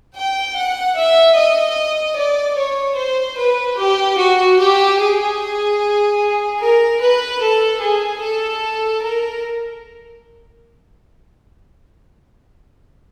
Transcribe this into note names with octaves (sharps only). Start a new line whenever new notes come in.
G5
F#5
E5
D#5
D5
C#5
C5
B4
G4
F#4
G4
G#4
A#4
B4
A4
G#4
A4
A#4